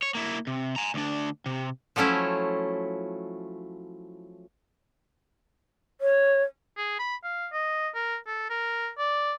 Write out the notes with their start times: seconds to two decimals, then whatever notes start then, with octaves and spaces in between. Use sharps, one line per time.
0.02 C#5
0.15 A#3 E4
0.47 C3
0.76 G#5 A#5
0.94 D2 D4
1.46 C3
1.96 F3 F#3 A3 C#4 E4
6.01 C#5
6.77 G#4
6.99 B5
7.24 F5
7.53 D#5
7.95 A#4
8.27 A4
8.50 A#4
8.98 D5